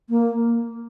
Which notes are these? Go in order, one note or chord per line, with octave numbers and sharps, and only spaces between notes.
A#3